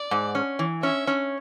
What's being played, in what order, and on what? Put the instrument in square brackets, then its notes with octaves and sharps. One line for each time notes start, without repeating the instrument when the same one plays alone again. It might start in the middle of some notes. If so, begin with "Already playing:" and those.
Already playing: [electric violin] D5
[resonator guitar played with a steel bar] G#2
C#4
E3
[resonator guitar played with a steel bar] C#4 [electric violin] E5
[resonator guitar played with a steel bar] C#4